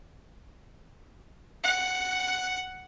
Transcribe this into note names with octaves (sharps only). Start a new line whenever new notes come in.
F#5